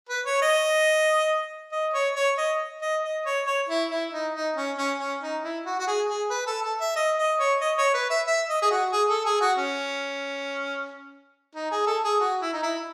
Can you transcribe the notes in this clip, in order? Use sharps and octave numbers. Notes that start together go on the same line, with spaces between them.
B4
C#5
D#5
D#5
C#5
C#5
D#5
D#5
D#5
C#5
C#5
E4
E4
D#4
D#4
C#4
C#4
C#4
D#4
E4
F#4
F#4
G#4
G#4
B4
A4
A4
E5
D#5
D#5
C#5
D#5
C#5
B4
E5
E5
D#5
G#4
F#4
G#4
A4
G#4
F#4
C#4
D#4
G#4
A4
G#4
F#4
E4
D#4
E4